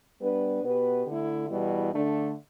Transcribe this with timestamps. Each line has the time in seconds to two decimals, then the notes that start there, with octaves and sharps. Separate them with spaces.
0.20 G3 B3 D4 B4
0.63 B2 B3 G4 B4
1.06 D3 A3 E4
1.49 E2 B2 G3 E4
1.91 D3 A3 D4